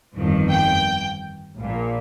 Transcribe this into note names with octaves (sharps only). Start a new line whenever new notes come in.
G1 F2 D#3
G5
A#1 A#2